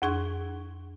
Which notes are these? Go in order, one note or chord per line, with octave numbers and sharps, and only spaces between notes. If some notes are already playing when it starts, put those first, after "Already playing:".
F2 D4 G#4 C#6 G#6